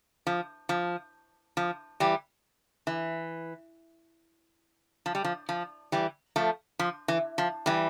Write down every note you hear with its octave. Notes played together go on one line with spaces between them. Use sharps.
F3
F3
F3
E3 G3
E3
F3
G3
F3
F3
E3 G3
F3 A3
F3
E3
F3
E3 G3